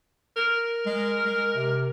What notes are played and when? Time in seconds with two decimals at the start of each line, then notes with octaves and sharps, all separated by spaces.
0.36 A#4
0.86 G#3
1.25 G#3
1.55 C3